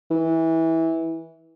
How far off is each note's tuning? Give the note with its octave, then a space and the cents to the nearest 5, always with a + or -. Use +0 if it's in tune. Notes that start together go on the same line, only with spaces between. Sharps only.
E3 -20